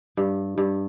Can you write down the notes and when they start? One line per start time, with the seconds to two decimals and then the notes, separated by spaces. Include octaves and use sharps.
0.17 G2
0.58 G2